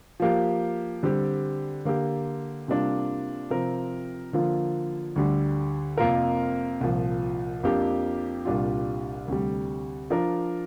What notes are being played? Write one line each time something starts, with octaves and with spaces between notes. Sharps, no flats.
F3 A#3 G4
D3 G3 C4 G4
D3 A#3 G4
C3 G3 A#3 D4 F4
C3 F3 C4 A#4
D3 F3 A#3 F4
D2 D3 G3
F2 C3 A#3 F4 A#4
C2 A#2 F3
F2 F3 A#3 D4 G4
C2 A#2 G3 D4 F4
D2 C3 G3
F3 D4 A#4